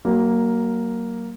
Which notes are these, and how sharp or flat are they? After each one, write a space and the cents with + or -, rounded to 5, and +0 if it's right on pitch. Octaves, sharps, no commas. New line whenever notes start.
F#3 +30 A#3 +0